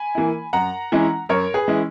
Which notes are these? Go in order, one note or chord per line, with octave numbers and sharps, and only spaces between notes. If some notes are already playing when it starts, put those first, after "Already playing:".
Already playing: G#5 B5
E3 A#3 E4
F#2 F#5 A#5
E3 G#3 C#4 E4
F#2 A#4 C#5
G#4 B4
E3 G#3 C#4 E4